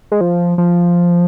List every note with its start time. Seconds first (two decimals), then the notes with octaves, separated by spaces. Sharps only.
0.12 G#3
0.21 F3
0.58 F3